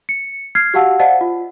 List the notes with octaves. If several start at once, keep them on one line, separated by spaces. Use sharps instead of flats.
C#7
F6 G#6 C7
F#4 G4 F5 F#5 A5 E6
C5 D5 D#5 F5 F#5 A5
F4